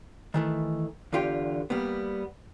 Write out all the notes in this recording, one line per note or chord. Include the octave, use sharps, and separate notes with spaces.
D#3 E3 A3
E2 D3 F4 G4 G5
G3 A#3 B3